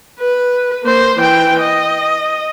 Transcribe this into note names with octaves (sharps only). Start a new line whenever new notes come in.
B4
A#3 C5
E3 G5
D#5